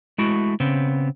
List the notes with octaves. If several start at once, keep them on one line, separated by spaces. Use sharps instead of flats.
G#3 A3 E4 F#4
C#3 B3 C4